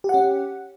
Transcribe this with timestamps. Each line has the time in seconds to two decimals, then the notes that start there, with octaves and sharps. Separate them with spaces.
0.04 G4
0.09 F#5
0.14 C#4